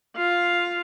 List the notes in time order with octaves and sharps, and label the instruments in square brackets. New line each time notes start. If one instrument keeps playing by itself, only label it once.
[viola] F4 F5